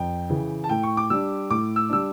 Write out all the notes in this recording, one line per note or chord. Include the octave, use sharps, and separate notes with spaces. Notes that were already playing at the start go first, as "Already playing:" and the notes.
Already playing: F2 G5
C#3 E3
A5
A2 G5
C#6
D6
G3 D4 E6
A2 D6
E6
G3 D4 E6